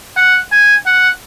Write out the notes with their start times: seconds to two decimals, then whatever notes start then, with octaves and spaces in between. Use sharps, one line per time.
0.17 F#5
0.52 G#5
0.86 F#5